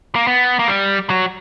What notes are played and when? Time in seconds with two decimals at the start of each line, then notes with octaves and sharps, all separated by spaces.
0.15 A#3
0.27 B3
0.59 A#3
0.68 G3
1.10 F#3